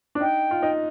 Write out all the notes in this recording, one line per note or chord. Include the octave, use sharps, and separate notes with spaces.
D4
D#4 G5
F4
D#4